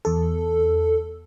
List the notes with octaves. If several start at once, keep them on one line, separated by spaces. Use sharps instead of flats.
E2 A4